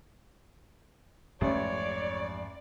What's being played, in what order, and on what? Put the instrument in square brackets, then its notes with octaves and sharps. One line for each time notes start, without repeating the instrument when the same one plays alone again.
[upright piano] A1 [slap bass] F2 G#2 G3 [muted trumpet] C#5 [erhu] D5